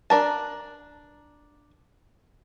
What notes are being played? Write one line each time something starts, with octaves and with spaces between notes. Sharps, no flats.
D4 A#4 A5